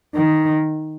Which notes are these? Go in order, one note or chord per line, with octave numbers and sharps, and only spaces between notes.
D#3